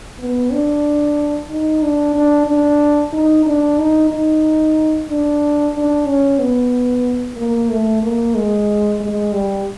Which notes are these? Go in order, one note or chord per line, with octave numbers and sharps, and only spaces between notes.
B3
D4
D#4
D4
D4
D4
D#4
D4
D#4
D#4
D4
D4
C#4
B3
A#3
A3
A#3
G#3
G#3
G3